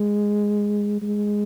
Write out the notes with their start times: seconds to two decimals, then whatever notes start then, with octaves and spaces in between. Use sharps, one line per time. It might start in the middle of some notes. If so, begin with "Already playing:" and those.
Already playing: G#3
1.02 G#3